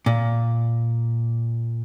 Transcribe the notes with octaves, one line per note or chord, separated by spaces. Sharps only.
A#2